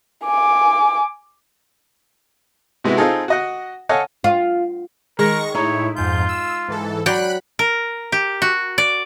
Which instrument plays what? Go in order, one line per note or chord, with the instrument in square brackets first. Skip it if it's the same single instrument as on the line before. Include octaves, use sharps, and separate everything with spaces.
[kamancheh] G#5 D6
[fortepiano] C3 G#3 B3 E4 F#4
C4 D#4 F4 G#4 A4
F#4 D#5 F#5
A4 C#5 D#5 F5 F#5 G#5
[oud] F4
[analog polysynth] D#3 C#6 A#6 [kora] G#3 [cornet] A#4
[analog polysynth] A2 E4 [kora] D#4 [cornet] C#5
[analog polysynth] F2 G#2 G6 [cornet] F4
[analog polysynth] E6
G#2 E3 A4
[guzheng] F#3 D5 G5 [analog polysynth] B5 F#6
[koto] A#4
G4
F#4
D5